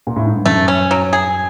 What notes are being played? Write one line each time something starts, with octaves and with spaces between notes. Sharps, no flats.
A#2
A2
G#2
G2
F#2 A3
C#4
F#3
G#4